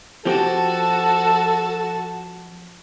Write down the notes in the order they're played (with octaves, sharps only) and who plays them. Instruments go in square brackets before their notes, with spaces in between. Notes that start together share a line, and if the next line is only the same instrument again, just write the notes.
[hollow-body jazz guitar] F3 C4 G4 [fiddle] F#4 A5 [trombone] A4